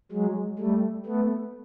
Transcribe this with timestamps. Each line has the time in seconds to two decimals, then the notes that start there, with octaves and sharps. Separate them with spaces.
0.12 F#3 G#3
0.59 G3 A3
1.06 A3 B3